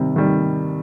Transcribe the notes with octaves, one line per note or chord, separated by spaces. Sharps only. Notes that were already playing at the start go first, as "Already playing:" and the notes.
Already playing: C3 D#3 G3
D#3 G3